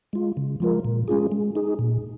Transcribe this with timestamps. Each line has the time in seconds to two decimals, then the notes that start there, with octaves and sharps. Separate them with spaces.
0.13 G#3 F4
0.37 C#3
0.60 F3 G#3 F4 A#4
0.85 A#2
1.08 G#3 C#4 F4 G#4
1.32 G#3
1.55 D#4 G#4
1.79 A#2